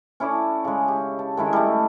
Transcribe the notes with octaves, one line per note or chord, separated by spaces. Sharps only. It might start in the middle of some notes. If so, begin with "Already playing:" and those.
C#4 E4 A4 D5
C#3 G#3
G4
A5
D#3 G#3 E4 A4
G3 A3